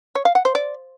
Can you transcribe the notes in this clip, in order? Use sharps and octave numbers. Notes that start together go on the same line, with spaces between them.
C#5
F5
F#5
C5
D5